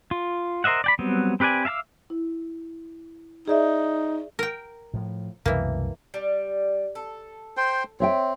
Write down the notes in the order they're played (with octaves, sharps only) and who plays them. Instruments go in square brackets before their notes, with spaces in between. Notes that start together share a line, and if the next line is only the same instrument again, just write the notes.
[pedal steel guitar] F4
A#4 C5 D#5 E5 F#5
D5 G5 B5
F#3 G3 B3 C4
C4 G4 B4 D5 G#5
E5 F5 A5 D6 E6
[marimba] E4
[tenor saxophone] D#4 [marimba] G#4 D5 E5
[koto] A#4 G5
[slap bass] A2 F3
[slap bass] C2 F#2 B2 [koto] E3 A#3
[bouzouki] G3
A4
[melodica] C5 G5
[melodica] C4 [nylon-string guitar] C#5 E5 G5